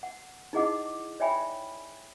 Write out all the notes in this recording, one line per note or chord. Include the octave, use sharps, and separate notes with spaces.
F#5
D#4 E4 G#4 D#5 F#5 D6
C#5 D5 E5 G5 G#5 B5